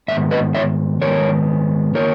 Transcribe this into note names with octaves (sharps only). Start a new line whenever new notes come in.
G#2 D#3 B3 E5
B4 D#5
C#5 E5
G#2 D#3 G#3 B3 A#4 C#5
D#3 A#3 A#4 C#5